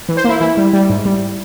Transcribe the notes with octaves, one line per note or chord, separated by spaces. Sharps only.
E3
C5
A#3 E4
E3 E4
G3
G3
G#2
G3